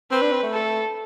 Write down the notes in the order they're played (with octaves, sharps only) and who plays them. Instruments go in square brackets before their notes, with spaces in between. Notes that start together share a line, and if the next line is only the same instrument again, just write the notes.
[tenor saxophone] C4 [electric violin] B4
[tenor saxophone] D4
C4
A3
[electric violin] A4